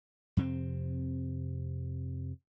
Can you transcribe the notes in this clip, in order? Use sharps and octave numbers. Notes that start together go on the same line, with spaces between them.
F2 C3 A#3 C4